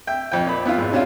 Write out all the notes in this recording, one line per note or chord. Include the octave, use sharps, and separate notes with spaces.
E5 G5
F2 F3 G5
A#2 B5
B3 E4 F4
G#1
C3 C#4 D4 F4